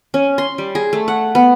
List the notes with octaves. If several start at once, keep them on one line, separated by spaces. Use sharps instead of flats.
C#4
C6
G3
G#4
A3
F#5
B3